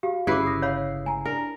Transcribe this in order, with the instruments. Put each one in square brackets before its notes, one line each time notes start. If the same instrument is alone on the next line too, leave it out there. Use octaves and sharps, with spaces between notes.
[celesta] F#4 F5 [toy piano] G4
[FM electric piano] G1 C#3 C7 [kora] E4 B4 [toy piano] G4 D6
[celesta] D#6 A#6
[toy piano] C#5 F5 B5
[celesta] G#5 A#5
[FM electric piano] D4 [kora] A#4